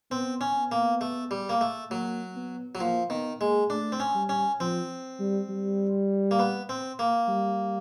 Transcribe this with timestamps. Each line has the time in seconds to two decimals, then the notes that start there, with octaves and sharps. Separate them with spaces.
0.11 B3 C4
0.41 C#4
0.56 B3
0.72 A#3
1.01 A3
1.31 G3
1.49 A#3
1.61 A3
1.91 F#3 A#3
2.36 B3
2.75 F#3
2.80 F3 A#3
3.10 D#3 B3
3.40 G#3 A#3
3.70 A3 D4
3.92 C4
4.00 C#4
4.15 G3
4.29 C#4
4.60 F3 C4
5.19 G3
5.49 G3
6.31 A#3
6.39 B3
6.69 C4
6.99 A#3
7.28 G3